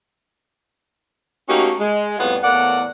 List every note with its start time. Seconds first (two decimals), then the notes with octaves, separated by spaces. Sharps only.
1.49 A3 A#3 C#4 D#4 F#4 G4
1.80 G#3
2.19 F2 A2 G3 B3 F4
2.43 E2 A2 A#3 D5 F#5